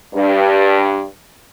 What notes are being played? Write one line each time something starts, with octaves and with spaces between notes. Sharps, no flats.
G2